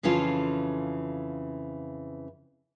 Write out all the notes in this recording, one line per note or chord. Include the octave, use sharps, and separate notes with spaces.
F2 C#3 E3 C#4 F4 A4